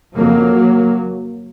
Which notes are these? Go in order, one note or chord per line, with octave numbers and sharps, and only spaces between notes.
F2 C#3 F#3 A#3